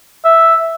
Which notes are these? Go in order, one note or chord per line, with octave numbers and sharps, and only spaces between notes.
E5